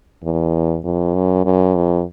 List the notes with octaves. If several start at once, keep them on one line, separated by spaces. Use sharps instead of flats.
E2
F2
F#2
F#2
F2